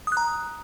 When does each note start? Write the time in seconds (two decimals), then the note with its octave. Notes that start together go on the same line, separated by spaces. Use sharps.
0.07 D#6
0.12 F#6
0.17 A#5